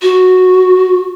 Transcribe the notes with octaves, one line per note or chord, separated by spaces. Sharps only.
F#4